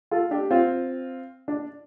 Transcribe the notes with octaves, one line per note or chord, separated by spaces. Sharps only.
F4 A4
D4 G4
C4 F4
D4